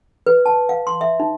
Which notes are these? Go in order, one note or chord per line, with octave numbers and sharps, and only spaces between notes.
B4
A5
F5
C6
E5
D#4